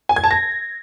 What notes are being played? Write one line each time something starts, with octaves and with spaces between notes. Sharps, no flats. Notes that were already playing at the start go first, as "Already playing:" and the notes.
G#5
G#6
A5
A#6